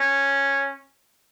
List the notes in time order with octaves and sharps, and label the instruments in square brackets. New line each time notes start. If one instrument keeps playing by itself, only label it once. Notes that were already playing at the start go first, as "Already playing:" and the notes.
Already playing: [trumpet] C#4